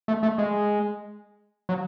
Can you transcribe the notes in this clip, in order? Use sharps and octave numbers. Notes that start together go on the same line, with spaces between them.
A3
A3
G#3
F#3